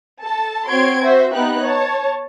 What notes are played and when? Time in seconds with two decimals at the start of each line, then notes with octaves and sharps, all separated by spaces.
0.22 A4 A5
0.69 C4 F#4 C#5 C6 G#6 D7
1.01 F#4 C5 E5
1.32 B3 D#4 G4 F#6
1.63 C#5 A5